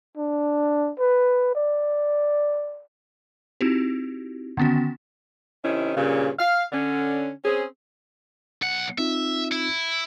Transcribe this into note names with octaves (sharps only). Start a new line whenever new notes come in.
D4
B4
D5
C4 D#4 E4 F#4 G4
D3 D#3 B3 C#4 F#4
C3 D#3 C#4 E4
G2 A#2 C#3
F5
D3 C#4
C4 C#4 G#4
B1 F#5
C4 D#4 F4 E5
E4